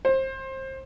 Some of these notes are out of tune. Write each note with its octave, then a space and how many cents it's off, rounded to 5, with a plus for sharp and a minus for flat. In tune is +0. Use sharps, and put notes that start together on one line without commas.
C5 +25